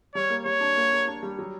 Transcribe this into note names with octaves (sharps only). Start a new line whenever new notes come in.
G3 C#5
A#3
G3 C#5
D4
A#3
A#3
D4
G3
F#3